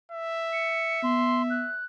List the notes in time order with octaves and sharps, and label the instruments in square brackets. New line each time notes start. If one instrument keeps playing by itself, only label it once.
[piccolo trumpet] E5
[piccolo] C#7
[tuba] B3 [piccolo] C6
[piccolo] F#6